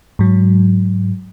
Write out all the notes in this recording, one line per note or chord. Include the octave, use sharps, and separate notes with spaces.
G#2 F#3